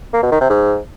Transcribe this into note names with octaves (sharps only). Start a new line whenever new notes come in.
A#3
B2
D#3
C3
G#2